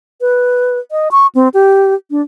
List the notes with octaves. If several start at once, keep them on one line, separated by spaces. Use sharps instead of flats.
B4
D#5
C#6
C4
G4
D4